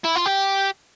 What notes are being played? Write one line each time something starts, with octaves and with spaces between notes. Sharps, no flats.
E4
F4
G4